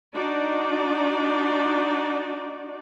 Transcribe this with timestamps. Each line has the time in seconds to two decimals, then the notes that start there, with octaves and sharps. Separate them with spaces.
0.15 D4 D#4 F#4 D5